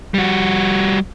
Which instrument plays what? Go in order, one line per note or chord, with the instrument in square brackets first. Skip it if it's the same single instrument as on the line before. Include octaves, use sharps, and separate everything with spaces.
[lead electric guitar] G3 F#4